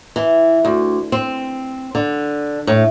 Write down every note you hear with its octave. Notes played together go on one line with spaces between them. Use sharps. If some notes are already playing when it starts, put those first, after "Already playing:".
E3
D2
C4
D3
A2